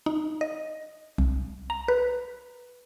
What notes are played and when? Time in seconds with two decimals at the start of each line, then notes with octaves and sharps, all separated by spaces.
0.06 D#4
0.41 D#5
1.18 C2
1.70 A#5
1.88 B4